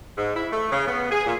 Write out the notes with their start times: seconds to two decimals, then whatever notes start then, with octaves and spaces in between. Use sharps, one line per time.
0.17 G#2
0.35 E4
0.52 A3
0.71 C#3
0.87 B3
1.11 G#4
1.26 A#2